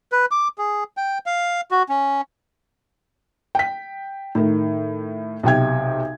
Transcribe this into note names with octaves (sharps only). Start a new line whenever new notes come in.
B4
D6
G#4
G5
F5
F#4
C#4
G5 B6
A2 D#3
B1 C3 G5 G#6